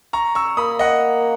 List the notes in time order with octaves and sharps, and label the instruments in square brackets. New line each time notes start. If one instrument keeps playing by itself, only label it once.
[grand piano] A#5 C#6
C#6 E6
[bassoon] A#3 [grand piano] B5 D#6
[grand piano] D#5 F#5